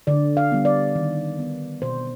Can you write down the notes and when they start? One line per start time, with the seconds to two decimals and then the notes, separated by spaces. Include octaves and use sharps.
0.07 D3 D5
0.37 F5
0.52 G3 B3
0.65 D5
0.95 D#3
1.39 B3
1.82 B2 C5